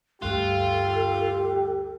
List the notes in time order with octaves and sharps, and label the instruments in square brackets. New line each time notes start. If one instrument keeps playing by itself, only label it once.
[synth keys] D2 G2 F#6 [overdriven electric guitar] F4 [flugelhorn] G4 [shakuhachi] A4